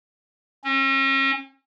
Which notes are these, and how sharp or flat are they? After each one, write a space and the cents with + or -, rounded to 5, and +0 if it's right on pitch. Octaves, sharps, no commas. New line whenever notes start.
C#4 -40